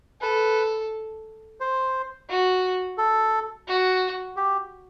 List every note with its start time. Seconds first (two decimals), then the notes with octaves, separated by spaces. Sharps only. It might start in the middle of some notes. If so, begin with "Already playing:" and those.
0.21 A4 B4
1.60 C5
2.29 F#4
2.98 A4
3.68 F#4
4.37 G4